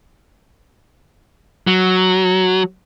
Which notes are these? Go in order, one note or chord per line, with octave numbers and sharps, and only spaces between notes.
F#3